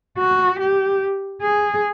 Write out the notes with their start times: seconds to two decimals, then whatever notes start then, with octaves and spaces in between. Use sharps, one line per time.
0.17 F#4
0.59 G4
1.41 G#4